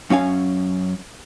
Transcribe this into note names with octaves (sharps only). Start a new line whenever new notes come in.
F#2 C#4 F5 G#5